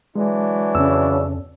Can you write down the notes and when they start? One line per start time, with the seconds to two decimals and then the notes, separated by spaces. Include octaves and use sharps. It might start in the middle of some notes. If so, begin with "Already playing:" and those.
0.16 E3 F#3 G#3 D4
0.75 F2 C#3 E6